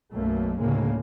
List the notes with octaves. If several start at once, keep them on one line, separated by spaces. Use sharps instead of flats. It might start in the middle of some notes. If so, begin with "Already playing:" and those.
B1 F#2 B2 A3 A#3
D2 A2 C#3 G#3 A#3